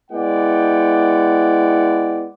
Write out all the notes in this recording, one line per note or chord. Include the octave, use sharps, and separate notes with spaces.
G#3 B3 E4 D5 F#5 G5